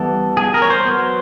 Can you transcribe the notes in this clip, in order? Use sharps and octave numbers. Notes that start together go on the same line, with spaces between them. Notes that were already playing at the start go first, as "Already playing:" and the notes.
Already playing: E3 G3 B3 A4
G#4
A#4
C#5
C5
F#3 B3